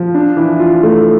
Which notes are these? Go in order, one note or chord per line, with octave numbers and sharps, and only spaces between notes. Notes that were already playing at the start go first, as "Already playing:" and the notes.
Already playing: F3
D4
E3
F4
A3